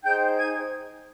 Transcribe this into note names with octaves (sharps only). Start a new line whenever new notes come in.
D#4 G#4 C5 G5 G6
G#5 G#6